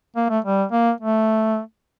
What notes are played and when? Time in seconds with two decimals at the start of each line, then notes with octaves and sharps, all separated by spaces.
0.16 A#3
0.30 A3
0.45 G3
0.72 A#3
1.01 A3